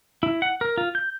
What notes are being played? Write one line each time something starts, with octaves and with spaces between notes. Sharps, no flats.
E4
F#5
A#4
F4
G6